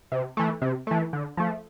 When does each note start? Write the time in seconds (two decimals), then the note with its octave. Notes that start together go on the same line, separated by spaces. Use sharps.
0.12 C3
0.37 E3 A3
0.62 C3
0.87 E3 A3
1.13 D3
1.37 F3 A3